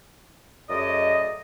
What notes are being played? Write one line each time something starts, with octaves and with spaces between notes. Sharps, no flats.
F#2 A3 G#4 D5 D#5